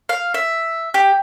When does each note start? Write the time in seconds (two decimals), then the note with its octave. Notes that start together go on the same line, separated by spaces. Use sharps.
0.09 F5
0.34 E5
0.94 G4